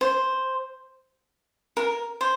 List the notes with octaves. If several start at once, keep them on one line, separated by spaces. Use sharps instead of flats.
C5
A#4
C5